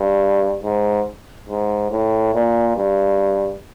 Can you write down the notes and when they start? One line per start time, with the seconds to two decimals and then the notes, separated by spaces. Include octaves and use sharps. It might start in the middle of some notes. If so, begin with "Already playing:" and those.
Already playing: G2
0.63 G#2
1.49 G#2
1.91 A2
2.34 A#2
2.77 G2